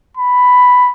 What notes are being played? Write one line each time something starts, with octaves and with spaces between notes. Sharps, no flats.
B5